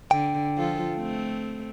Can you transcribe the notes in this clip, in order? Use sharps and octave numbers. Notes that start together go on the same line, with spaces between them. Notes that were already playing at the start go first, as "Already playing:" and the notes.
D3 G5
F3 F4 A4
A3 C4